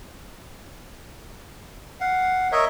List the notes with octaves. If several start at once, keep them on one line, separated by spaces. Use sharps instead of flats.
F5 F#5
A#4 C#5 D#5 E5